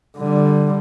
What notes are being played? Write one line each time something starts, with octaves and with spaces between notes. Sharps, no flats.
D3 G3